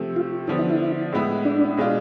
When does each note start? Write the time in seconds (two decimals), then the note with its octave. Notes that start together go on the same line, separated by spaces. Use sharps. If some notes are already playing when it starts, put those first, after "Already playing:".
Already playing: C3 F3 A3
0.16 F4
0.48 D3 F3 B3 E4
0.59 E4
0.69 E4
1.13 A2 G#3 B3 E4
1.45 D4
1.77 B2 G#3 D4 F4